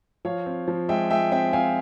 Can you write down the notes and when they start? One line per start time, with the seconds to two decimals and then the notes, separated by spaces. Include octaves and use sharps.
0.25 F3 C#5 F5
0.46 C4
0.68 F3
0.89 G#3 E5 G5
1.10 G#3 E5 G5
1.32 C4 E5 G5
1.53 C4 F5 G#5